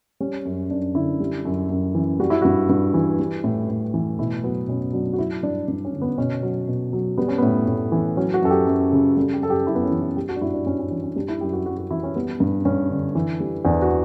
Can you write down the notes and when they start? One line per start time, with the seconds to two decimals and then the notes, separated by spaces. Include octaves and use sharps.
0.20 G3 C#4
0.45 F#2
0.70 F#2 D4
0.94 D3 E4
1.20 G3
1.45 F#2
1.70 F#2
1.95 E3
2.20 G3 F#4
2.30 E4
2.42 G2 F#4
2.69 G2
2.94 E3
3.19 G3
3.44 A2
3.69 A2
3.94 E3
4.19 B2 E4
4.43 F#3 B3
4.68 B2 C#4
4.93 F#3 D4
5.13 F#4
5.19 F#3 E4
5.43 G2 D4
5.68 G2 D4
5.85 C#4
5.93 D3
6.02 B3
6.18 B2 C#4
6.43 F#3
6.68 B2
6.93 F#3
7.18 G3 B3
7.28 C#4
7.38 A2 B3
7.68 A2
7.92 E3
8.17 F#3 C#4
8.34 F#4
8.42 F#2 A4
8.50 G4
8.67 F#2
8.92 C#3
9.17 G3 A4
9.33 G4
9.41 F#2 A4
9.50 G4
9.67 F#2 E4
9.75 B3
9.83 C#4
9.91 E3
10.00 E4
10.16 G3 G4
10.29 F#4
10.36 D4
10.42 G2 E4
10.54 D4
10.66 G2 C#4
10.79 C#4
10.91 E3 C#4
11.03 C#4
11.16 G3 D4
11.28 E4
11.41 F#2 G4
11.53 F#4
11.66 F#2 F#4
11.78 F#4
11.90 E3 E4
12.03 C#4
12.16 G3 B3
12.40 G2
12.65 G2 C#4
12.90 D3
13.15 E3
13.40 G3
13.65 E2 D4
13.82 F#4